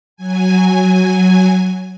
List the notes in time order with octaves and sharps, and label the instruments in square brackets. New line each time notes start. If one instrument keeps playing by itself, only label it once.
[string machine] F#3 G#5